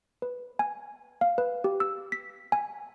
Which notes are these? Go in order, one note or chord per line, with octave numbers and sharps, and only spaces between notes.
B4
G#5
F5
B4
G4
E6
B6
G#5